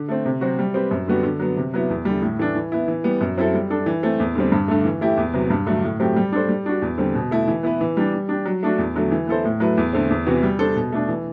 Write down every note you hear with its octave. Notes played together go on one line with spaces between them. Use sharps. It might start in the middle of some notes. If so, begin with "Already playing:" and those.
Already playing: D3
A3 C4
C3
F#3 C4 F#4
G3
C4 G4 B4
F#2
D3 G3 B3 F#4
D3
F#3 B3
C3
F#3 B3 E4
E2
D3 G3
A2
E3 A3 D4
E3
B3 E4
E3
G3 B3
F#2
F#3 C4 E4 A4
G3
D4 A4
E3
A3 C4
E2
D3 G3 C4
G2
D3 A3
E3
A3 E4 G4
E2
C3 F#3 B3
G2
D3 F#3 A3
A2
F#3 A3 C4 G4
G3
D4 A4 C5
G3
D4 F#4
E2
D3 G3 C4
B2
A3 E4
E3
B3 E4 B4
E3
G3 D4
G3
D4 G4
F#3
A3 D4 F#4
E2
D3 F#3 A3
E3
B3 E4 A4 C5
A2
F#3 A3 E4 B4
E2
D3 A3 C4
E2
C3 E3 B3 F#4
G3
D4 A4 C5
B2
A3 D4
E3